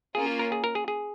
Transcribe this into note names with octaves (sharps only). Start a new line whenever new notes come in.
A#3 C#4 F4 G#4
A#4
G#4
A#4
G#4
G#4